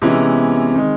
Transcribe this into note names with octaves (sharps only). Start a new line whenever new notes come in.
C3 E3 G#3 B3 C#4 E4
D#3 G#3 C4